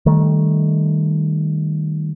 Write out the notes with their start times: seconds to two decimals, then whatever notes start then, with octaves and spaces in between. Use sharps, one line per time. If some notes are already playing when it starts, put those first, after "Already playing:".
0.06 D#3 G3 A3